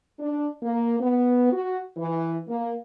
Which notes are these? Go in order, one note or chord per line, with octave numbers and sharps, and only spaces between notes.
D4
A#3
B3
F#4
E3
A#3